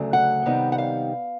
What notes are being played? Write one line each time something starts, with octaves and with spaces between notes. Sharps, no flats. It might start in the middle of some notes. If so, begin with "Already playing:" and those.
Already playing: D2 C#3 F#3 A3
F#5
C3 D#3 G3 B3 D#4
F#5
F5